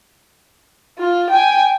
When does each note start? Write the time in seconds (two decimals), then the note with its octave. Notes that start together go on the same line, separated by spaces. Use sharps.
0.99 F4
1.30 G5 G#5